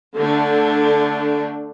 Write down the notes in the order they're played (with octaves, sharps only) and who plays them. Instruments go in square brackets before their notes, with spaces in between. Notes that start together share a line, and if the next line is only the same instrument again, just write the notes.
[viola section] D3 A3 D4